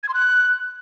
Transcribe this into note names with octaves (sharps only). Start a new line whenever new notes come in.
G#6
C6
F#6